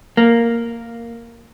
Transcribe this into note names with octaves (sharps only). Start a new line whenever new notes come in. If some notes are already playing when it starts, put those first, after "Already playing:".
A#3